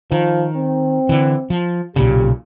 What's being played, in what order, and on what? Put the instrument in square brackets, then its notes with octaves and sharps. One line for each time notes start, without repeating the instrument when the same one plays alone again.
[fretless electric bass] D#3 [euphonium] F3
[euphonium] C4
[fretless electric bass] D3 E3
F3
[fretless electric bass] B1 A#2 C#3 [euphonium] G4